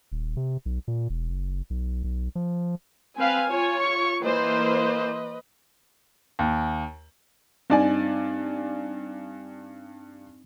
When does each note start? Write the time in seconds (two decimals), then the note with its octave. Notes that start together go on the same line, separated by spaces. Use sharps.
0.12 D#1
0.37 C3
0.66 B1
0.88 A#2
1.10 E1
1.29 F#1
1.70 B1
2.04 B1
2.35 F3
3.17 C4 B4 F5 G#5
3.49 F4 C#5
3.80 C#6
4.23 E3 A#3 B4 C5 D#5
6.39 D#2
7.70 G2 C4 D#4 D5 G#5